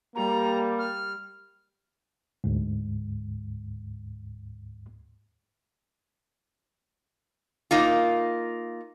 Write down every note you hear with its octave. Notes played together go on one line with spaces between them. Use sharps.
G3 A#3 A#5
F6
D2 G#2
A#3 D#4 F4